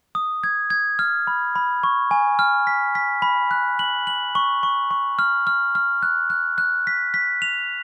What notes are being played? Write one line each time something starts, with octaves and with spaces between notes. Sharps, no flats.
D#6
G#6
G#6
F6
B5
B5
C#6
G#5
F6
B6
B6
B5
F#6
F#7
F#7
C#6
C#6
C#6
F6
F6
F6
F#6
F#6
F#6
B6
B6
F7